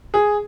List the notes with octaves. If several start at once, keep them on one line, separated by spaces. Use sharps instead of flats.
G#4